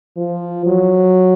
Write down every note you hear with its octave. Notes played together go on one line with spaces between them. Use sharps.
F3
F#3